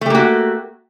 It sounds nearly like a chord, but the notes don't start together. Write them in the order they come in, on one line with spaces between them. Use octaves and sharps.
A3 G4 A#3 F#4